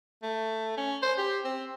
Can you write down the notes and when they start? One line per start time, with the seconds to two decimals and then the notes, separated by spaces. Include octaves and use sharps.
0.23 A3
0.78 C#4
1.02 C5
1.18 G4
1.44 C4